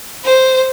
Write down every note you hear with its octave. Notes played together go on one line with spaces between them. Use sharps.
C5